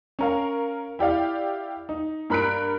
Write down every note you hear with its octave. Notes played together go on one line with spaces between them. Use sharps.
C#4 A#4 F5
E4 G4 D5 F5
D#4
G2 A#4 B5 F#6 B6 D7